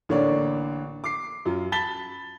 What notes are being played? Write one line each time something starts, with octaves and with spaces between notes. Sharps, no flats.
A1 D3 A#3 C#5 D5
D6 C7
F#2 F4
A5 B5 A6 B6 G7